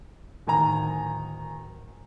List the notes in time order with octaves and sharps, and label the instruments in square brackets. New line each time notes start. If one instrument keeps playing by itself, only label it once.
[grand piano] D1 D#3 G#5 A#5